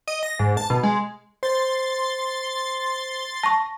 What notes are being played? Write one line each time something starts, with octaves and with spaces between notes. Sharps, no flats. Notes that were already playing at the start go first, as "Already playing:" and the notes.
D#5
A#6
G#2
A5
B2
G#3
C5 C6 A6
A5 C#6 A#6